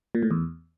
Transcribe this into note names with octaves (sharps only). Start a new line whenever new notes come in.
A#2
A2
E2